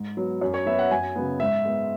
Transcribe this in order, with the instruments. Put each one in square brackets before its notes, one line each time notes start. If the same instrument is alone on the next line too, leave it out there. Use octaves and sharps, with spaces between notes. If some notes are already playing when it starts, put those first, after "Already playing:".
Already playing: [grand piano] G#2
F#3 B3
F#2
C#5
F#3 B3 E5
F#5
F#2 G#5
C#3 F#3 B3
G#2 E5
G#3 B3